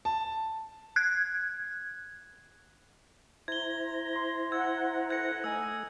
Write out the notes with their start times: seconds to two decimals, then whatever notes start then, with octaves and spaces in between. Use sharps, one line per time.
0.05 A5
0.96 F#6 G#6
3.48 E4 C5 A#5 G#6 G7
4.16 C6
4.52 F#5 E6 G#6
5.10 A4 B4 F#5 F#6 G#6 A#6 C#7
5.44 A3 D#4 G#5 E6